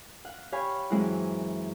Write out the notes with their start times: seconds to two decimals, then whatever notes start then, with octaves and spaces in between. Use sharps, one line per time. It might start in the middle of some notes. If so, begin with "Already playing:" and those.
0.25 F5 F#5
0.52 G4 C#5 F5 G#5 B5 C#6
0.90 F#2 E3 G#3 C4 E4 F#5